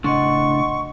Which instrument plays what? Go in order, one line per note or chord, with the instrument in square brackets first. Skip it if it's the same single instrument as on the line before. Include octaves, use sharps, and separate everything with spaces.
[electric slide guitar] A2 C#3 D4 [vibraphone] D#5 F#5 C6 [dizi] C#6